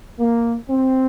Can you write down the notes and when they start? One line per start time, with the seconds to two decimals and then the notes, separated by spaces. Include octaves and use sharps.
0.19 A#3
0.70 C4